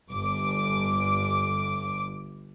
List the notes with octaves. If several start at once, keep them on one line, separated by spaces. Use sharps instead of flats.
G1 D6